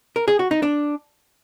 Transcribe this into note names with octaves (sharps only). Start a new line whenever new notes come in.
A#4
G#4
F#4
D#4
D4